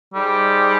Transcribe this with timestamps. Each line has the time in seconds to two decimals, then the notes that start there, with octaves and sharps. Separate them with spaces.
0.14 G3 D#4 G#4 C5